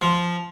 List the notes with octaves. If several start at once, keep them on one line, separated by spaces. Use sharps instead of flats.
F3